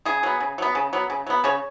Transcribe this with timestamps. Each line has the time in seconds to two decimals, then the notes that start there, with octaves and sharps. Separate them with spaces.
0.05 C#3 G#4
0.23 F#3 B3
0.40 C#3
0.58 F#3 B3
0.75 C#3
0.93 F#3 B3
1.10 C#3
1.27 F#3 B3
1.44 C#3 C#5